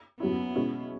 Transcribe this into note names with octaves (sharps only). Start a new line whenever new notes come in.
F#2 F#3 B3 C#4 E4
B2 G#3 C#4 E4